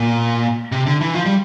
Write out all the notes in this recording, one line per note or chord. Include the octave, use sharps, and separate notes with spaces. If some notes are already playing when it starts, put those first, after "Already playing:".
Already playing: A#2
C3
D3
E3
F3
G3